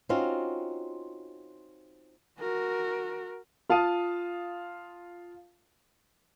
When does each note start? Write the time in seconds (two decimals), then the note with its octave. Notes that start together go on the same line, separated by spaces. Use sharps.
0.09 C4 C#4 D#4 F4 F#4
2.39 F#4 A#4
3.69 F4 F5 A5 D#6 D#7